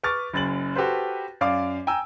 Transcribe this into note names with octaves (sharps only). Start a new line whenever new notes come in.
B4 C#6 D6 F6 A6
F#1 F#2 A6 F#7
F#4 G4 A4 B4 C5
F#2 D5 F5 D6
G5 G#5 A#5 E6